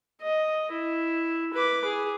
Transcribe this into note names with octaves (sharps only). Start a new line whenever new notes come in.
D#5
E4
B4 D6
G#4